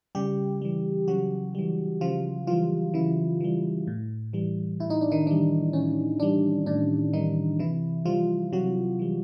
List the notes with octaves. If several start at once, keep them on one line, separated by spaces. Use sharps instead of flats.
C#3 G3 G4
E3 G3
C#3 F#3 F#4
E3 G3
C#3 F3 F4
E3 F3 G3 F4
C#3 E3 E4
E3 G3
A2
E3 G3
A2 E4
D#4
D4
D#3 D#4
E3 G3 D4
A2 C#4
E3 G3 D4
A2 D4
D#3 E3 G3 D#4
C3 E3 E4
E3 F3 G3 F4
C3 F#3 F#4
E3 G3